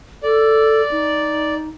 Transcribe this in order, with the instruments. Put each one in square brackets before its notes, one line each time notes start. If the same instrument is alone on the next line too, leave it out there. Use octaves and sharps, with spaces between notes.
[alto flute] A4 [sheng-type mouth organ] D5
[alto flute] D#4